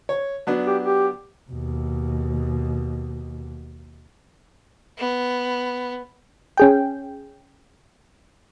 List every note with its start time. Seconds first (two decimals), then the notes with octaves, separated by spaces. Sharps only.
0.09 C#5
0.47 F#3 B3 D4
0.67 G4
0.83 G4
1.50 D#2 B2
4.98 B3
6.57 C#4 G#4 G5